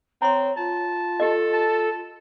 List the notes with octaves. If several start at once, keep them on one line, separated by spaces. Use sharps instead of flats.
C4 C#5 A#5 C6
F4 A5
G4 A4 D#5
A5